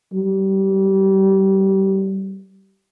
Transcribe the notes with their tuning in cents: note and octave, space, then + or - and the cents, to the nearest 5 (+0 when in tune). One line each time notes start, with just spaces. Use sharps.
G3 -25